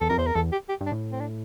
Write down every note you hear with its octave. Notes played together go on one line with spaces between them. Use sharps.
E2 A4
F2 A#4
E2 C5
A#4
E2 A4
G4
G4
G2
D4
A2
C4
D4